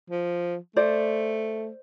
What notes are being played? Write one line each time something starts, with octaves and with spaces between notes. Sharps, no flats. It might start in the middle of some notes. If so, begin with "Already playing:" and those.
F3
A3 C5 D5